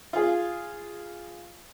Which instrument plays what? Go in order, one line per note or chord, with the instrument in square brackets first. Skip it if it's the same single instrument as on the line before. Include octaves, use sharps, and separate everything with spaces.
[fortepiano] F4 G#4